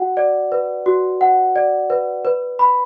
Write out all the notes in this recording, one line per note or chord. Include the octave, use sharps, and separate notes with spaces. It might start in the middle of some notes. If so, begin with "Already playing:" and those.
Already playing: F#4 F#5
D5
B4
F#4
F#5
D5
B4
B4
B5